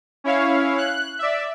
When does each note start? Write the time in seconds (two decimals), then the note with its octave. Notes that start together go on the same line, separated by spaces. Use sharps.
0.24 C#4 E4 C#5 F5
0.77 F#6
1.19 D5 E5